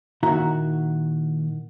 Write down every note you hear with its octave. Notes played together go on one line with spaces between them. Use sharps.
A#2 D#3 E4 F#4 E5 A#5